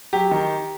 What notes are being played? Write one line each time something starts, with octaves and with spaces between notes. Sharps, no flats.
F#3 G4
D#3